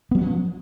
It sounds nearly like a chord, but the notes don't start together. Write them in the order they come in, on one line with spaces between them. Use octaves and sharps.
B3 F#3 C#4 F3